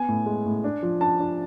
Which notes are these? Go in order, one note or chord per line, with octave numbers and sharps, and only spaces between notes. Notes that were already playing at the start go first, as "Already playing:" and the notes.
Already playing: B3 G#5
A2
G#3
A2
D4
F3
D4 A5
D4